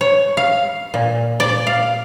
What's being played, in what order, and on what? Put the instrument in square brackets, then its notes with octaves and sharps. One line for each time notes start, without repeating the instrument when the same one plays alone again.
[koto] C#5
F5
A#2
D5
F5